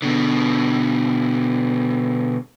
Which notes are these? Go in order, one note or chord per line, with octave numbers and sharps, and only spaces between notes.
B2 D3